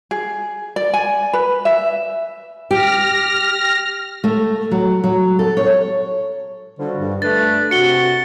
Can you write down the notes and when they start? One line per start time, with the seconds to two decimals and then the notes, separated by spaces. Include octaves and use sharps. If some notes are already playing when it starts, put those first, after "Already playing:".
0.11 G#4
0.76 D5
0.94 G#5
1.33 B4
1.65 E5
2.71 G4 F6 A#6
4.24 A3
4.71 F#3
5.04 F#3
5.39 A4
5.57 C#5
6.79 D3 F3 G3 F#4
6.99 G2
7.22 A3 D4 B4 A6
7.71 C3 F#4 C#7 G7